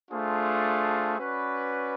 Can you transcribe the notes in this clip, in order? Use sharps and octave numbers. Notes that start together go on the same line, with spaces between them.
A3 D4 F4 G#4 C5
C#4 F#4 B4 D5